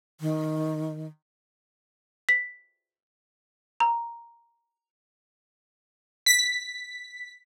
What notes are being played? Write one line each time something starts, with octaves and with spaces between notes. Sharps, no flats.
D#3
B6
A#5
B6